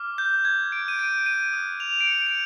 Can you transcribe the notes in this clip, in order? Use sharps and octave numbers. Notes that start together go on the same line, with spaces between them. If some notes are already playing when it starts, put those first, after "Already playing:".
Already playing: D6 F6
G6
G#6
D#6 F#6 D7
D#7
D7
D#7
D#6 F#6
F7
D7
C#7
D7